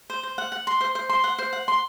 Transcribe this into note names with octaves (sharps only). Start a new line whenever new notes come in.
C5
C5
F#5
F#5
C6
C5
C5
C6
F#5
C5
F#5
C6